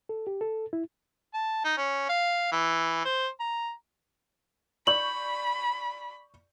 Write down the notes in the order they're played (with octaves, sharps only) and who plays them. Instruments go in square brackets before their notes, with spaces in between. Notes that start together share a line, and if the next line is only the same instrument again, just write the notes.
[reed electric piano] A4
G4
A4
E4
[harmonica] A5
D#4
C#4
F5
E3
C5
A#5
[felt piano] D5 C#6 G6 [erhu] B5 [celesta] F#7